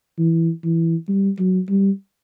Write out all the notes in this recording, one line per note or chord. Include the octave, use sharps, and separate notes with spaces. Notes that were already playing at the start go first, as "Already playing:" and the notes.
E3
E3
G3
F#3
G3